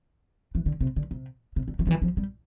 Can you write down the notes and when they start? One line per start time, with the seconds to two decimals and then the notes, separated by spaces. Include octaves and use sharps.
0.55 E3
0.66 D3
0.81 C3
0.96 D3
1.11 C3
1.56 C3
1.68 D3
1.79 E3
1.87 F3
1.91 E3
2.02 F3
2.17 G3